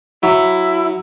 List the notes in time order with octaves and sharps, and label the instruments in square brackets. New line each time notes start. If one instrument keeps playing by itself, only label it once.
[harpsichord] F#3 [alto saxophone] E4